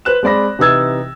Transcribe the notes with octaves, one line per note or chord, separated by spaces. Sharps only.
B4 C5 F#6 E7
G#3 C4 D5 B5 A#6
C3 E3 D#4 E6 G#6 A6